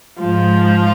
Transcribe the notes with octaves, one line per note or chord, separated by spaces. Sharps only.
G#2 F3 F4